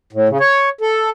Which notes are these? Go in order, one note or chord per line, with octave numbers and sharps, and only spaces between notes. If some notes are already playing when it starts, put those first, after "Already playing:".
A2
C#3
C#5
A4